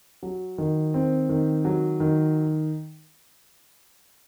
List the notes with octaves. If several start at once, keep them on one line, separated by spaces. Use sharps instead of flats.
F#3
D#3
C4
D#3
F#3
D#3